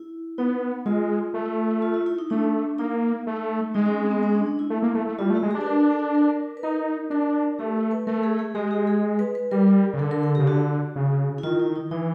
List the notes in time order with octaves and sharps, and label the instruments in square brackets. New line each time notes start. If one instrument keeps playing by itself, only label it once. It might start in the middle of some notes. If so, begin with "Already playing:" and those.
Already playing: [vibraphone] E4
[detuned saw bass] B3 [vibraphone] D#4
[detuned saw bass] G#3 [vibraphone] F4
[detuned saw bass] A3
[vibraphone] F4
F4
E4
D#4
[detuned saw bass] A3 [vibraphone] D4
[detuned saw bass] A#3 [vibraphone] D#4
[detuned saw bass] A3
[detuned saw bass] G#3 [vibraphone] D#4
[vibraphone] C#4
C4
B3
C#4
D4
D4
E4
[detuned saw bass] A3
A#3
A3
A3
[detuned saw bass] G3 [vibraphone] F4
[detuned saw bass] A3
[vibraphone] F#4
[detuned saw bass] G#3
[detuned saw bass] D4 [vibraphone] G4
[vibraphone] B4
A#4
A4
A#4
B4
[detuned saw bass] D#4 [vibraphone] A#4
[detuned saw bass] D4 [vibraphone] A#4
[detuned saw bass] A3 [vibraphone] G4
[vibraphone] B4
[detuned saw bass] A3 [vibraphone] A#4
[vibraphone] G#4
G#4
[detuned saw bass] G#3 [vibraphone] G4
[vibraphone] G4
G#4
B4
B4
[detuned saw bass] G3 [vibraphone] A#4
[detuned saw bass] C#3
[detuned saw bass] D3 [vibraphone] A4
[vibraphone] A#4
A4
[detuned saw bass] C#3 [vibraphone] G4
[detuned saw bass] D3 [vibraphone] F#4
[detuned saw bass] C#3
[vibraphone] E4
[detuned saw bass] D#3 [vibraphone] F4
[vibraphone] E4
D#4
[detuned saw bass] E3 [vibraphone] D#4